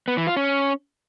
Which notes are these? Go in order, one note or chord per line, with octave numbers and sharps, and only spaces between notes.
B3
E3
F4
C#4